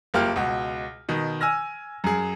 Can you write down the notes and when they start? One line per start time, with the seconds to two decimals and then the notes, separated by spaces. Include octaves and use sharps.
0.14 F#1 A#3 F4 G4 F6
0.36 C#2 B2 F#4
1.09 B2 D#3
1.41 G#5 E6 F6 A#6
2.04 F#2 G#4